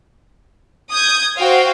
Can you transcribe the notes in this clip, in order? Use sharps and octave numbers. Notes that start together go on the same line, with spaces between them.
D#6 G6 G#6
F#4 C5 F5 G5